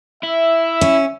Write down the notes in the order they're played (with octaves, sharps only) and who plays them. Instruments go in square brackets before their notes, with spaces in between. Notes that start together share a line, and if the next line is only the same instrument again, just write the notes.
[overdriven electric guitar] E4 [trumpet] E5
[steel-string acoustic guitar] C#4